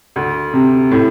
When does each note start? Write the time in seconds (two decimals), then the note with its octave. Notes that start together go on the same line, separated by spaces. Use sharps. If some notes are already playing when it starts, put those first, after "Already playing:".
0.16 D2
0.53 C3
0.91 A2